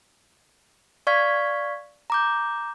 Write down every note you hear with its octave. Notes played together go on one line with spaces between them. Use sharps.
D5 F5 C#6 F6 G#6 B6
A#5 D6 G6